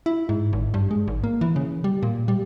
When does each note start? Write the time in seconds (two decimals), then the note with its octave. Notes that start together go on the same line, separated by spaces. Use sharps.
0.06 E4
0.29 G#2
0.53 G#1
0.74 G2
0.91 G#3
1.08 G#1
1.24 A#3
1.41 E3
1.56 C#3
1.84 G3
2.03 A#2
2.28 G3